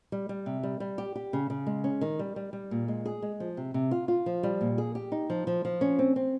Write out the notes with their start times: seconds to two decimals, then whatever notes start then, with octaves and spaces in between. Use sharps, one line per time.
0.12 G3
0.29 G3
0.46 C3
0.63 G3
0.80 G3
0.98 G4
1.15 G4
1.33 C#3
1.50 C#3
1.66 G#3
1.84 C#4
2.01 D#3
2.19 G3
2.36 G3
2.53 G3
2.71 A#2
2.88 G#3
3.06 G#4
3.22 G#3
3.40 F3
3.57 C3
3.74 C3
3.91 F4
4.08 F4
4.26 F3
4.43 G3
4.61 A#2
4.78 G#4
4.95 G4
5.12 D#4
5.30 F3
5.47 F3
5.65 F3
5.81 C#4
5.99 C4
6.16 C4